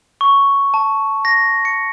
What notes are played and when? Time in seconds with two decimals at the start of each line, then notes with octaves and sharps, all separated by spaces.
0.21 C#6
0.74 A5
1.25 A#6
1.65 C#7